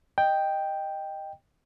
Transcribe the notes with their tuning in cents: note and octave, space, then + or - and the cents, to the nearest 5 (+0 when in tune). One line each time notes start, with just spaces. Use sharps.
D#5 -5 G5 +5